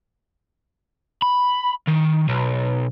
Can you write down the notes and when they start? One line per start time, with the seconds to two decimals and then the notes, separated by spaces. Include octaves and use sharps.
1.22 B5
1.88 D#3
2.29 B1